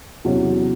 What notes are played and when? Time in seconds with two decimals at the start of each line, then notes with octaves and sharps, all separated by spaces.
0.24 E2 C3 F#3 C#4